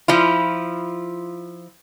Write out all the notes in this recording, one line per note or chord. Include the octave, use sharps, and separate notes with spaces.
F3 E4 F4